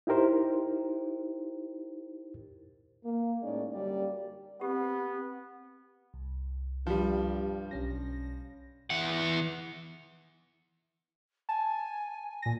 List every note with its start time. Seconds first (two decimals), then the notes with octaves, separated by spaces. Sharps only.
0.07 D#4 E4 G4 A#4 C5
3.03 A#3
3.42 A2 G#3 C#4 D#4 D5
3.72 F#2 D3 G3 A#3 G4 D5
4.61 B3 C4 G4
6.14 C2
6.87 G2 F3 G3
7.71 B1 C#4 A#6
8.90 E3 F#5
11.49 G#5 A5
12.42 A#2 A#6